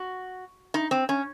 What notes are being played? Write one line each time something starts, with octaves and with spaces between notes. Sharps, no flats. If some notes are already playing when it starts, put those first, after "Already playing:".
Already playing: F#4
D#4
C4
C#4